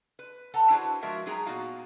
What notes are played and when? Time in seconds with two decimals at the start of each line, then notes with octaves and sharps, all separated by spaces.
0.19 B4
0.54 A4 F#5 A5 A#5
0.70 D4 E4 F#4 G#4 B4 C5
1.02 F3 G#3 F#4 A#4 E5
1.26 F#3 G#3 D#4 G#4 G5 A#5
1.46 A#2 B3 D#4 F#4 F5